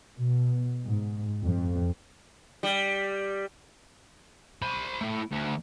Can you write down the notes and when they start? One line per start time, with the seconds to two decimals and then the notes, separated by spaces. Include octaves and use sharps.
0.19 B2
0.85 G#2
1.44 F2
2.63 G3
4.62 C5 B5
5.01 A3 E4
5.31 D2